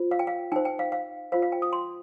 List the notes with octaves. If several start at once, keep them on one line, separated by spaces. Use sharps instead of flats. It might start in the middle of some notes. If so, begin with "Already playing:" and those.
Already playing: F4 C5
F5
G5
F5
D#4 C5 G5
G5
F5
F5
F4 C5 F5
F5
G5
D#6
C6